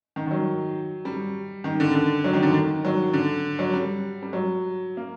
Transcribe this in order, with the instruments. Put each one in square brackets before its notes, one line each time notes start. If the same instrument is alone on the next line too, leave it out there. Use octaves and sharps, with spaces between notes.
[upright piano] D#3
D#3
F#3
G3
D#3
D3
D3
F#3
D#3
D3
D#3
F#3
D3
F#3
G3
G3
F#3
A#3